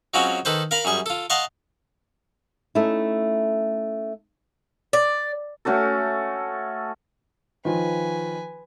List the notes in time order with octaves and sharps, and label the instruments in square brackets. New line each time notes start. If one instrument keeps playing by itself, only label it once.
[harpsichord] F#3 G#3 C4 C#4 F4 F#4
D#3 A4 B4 C5
A#4 F5 A#5 B5
F#2 G3 G#4 C#6
F4 A4
D#5 F5 F#5 A5 C6 C#6
[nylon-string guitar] A3 C#4 D#4 E4
[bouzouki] D5
[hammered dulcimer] A3 C#4 F#4 A4
[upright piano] D#3 F3 F4 [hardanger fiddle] B4 G#5